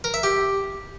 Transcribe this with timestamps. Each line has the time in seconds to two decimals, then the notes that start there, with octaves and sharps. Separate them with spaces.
0.04 A#4
0.14 E5
0.23 G4